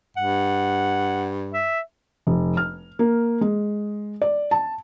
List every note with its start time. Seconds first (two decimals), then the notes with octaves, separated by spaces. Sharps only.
0.17 G2 F#5
1.53 E5
2.27 F1
2.57 F6
2.99 A#3
3.41 G#3
4.22 D5
4.51 A5